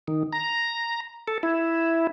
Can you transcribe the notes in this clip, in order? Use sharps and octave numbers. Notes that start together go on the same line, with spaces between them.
D#3
A#5
A4
E4